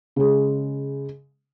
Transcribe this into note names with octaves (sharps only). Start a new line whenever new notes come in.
C#3 G#3